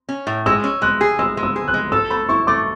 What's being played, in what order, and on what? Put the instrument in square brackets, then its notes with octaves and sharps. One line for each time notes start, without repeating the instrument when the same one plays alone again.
[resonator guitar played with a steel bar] C#4
A2
[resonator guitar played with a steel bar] G#3 [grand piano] E6
[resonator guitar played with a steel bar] C#4
[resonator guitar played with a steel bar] G#3 [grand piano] F#6
[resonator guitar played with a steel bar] G#4
[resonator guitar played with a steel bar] G#3 [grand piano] E6
[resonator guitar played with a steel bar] G#3
[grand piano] E6
[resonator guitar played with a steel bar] G#4
[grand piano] F#6
[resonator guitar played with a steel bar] G#3
[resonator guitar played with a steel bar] A4 [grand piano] E6
[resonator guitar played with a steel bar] A3 [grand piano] B5
[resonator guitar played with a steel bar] E4 [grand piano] C#6
[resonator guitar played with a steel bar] A3 [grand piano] D6